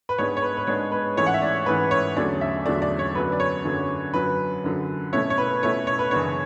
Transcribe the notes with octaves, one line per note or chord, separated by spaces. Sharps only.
B4
G#2 G#3 B3 D4 C#5
C#5
B4
B4
G#2 G#3 B3 D4 C#5
B4
G#2 E3 A3 C#4 E4 C#5
F#5
E5
D5
G#2 E3 A3 C#4 E4 B4
C#5
E2 D3 F#3 A3 C#4 D5
E5
E2 D3 F#3 A3 C#4 D5
D5
C#5
F#2 D3 F#3 B3 B4
D5
C#5
F#2 D3 F#3 B3
F#2 D3 F#3 B4
F#2 D3 F#3
B2 A3 C#4 E4 C#5
C#5
B4
B2 A3 C#4 E4 C#5
C#5
B4
F#2 C#3 E3 B3 D4 C#5